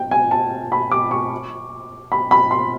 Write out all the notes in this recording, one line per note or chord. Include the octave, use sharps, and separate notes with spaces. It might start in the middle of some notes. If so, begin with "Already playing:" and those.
Already playing: G5
G#5
A5
B5
D6
C#6
B5
B5
C6